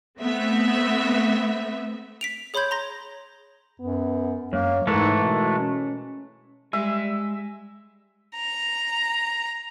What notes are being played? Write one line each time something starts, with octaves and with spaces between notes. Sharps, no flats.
A3 B3 C4 E5
B6 D7 F7
G#4 C#5 B5 C6 G6 G#6
A#5 C6 A#6
F#2 B3
F#2 A#3 C#5
G#2 E3 G#3 A3 A#4
B2
C#4
G3 G#3 E5 G#5
A#5